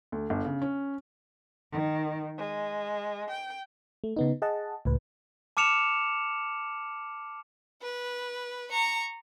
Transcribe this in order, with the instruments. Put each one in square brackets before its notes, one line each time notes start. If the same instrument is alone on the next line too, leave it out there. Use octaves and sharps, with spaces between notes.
[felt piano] D2
G1
C#3
C#4
[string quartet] D#3
G#3
G5
[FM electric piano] A3
C#3 B3 D#4
G#4 D#5 F#5 A5
C#2 A2 B4
[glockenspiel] A5 D6 F6 C#7 E7 F7
[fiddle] B4
A#5 C#6